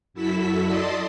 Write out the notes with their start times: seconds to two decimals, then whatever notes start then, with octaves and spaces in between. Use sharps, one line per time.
0.14 F#2 E4 F#4 A4 E5 B6
0.64 D5 D#5 A5 C6 D#6